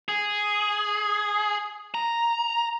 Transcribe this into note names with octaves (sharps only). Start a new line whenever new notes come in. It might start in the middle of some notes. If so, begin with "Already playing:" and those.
G#4
A#5